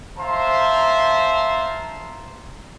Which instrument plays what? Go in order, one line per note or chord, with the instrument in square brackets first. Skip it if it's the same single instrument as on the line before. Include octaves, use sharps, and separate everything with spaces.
[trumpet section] C5 E5 F5 A5 A#5 C6